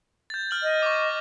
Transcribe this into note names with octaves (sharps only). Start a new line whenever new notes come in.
G6 A6
F6 F#7
D#5
C#6 D6
C#6